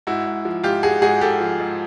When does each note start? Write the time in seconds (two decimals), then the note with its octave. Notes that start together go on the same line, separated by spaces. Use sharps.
0.07 G#2 E4 F#4
0.26 G#2
0.45 F3
0.64 G#2 F4 G4
0.83 G#2 F#4 G#4
1.02 G#2 F#4 G#4
1.21 G#2 G4 A4
1.40 F3
1.60 G#2